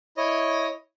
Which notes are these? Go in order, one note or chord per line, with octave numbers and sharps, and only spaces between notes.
E4 C#5 D#5